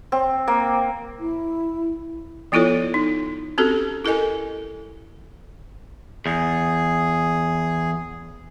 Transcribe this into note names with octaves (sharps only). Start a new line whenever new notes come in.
C4
A#3
E4
F3 B3 E4 F4 A4 C#5
D#4
C4 C#4 F#4 G4 A4
E4 A4 A#4 D#5 G#5
E2 G#4